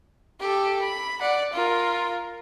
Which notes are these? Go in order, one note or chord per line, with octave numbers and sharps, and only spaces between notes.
G4 A4
B5
D5 F#5
F4 A#4